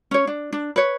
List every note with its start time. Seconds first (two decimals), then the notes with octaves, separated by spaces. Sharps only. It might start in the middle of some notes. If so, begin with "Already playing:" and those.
0.11 C#4 C#5
0.27 D4
0.53 D4
0.76 B4 C#5